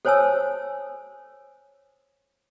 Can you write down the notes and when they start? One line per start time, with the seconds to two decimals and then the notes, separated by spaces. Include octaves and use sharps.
0.05 A4 C5 C#5 G#5 A5 E6